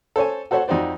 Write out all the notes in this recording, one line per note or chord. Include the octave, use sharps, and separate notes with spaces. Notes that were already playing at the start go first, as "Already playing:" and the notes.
A4 C5 C#5 G#5
F#4 A4 C5 C#5 F#5
F2 D#4 F#4 C5 D5